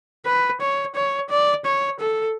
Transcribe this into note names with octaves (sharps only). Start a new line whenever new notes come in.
B4
C#5
C#5
D5
C#5
A4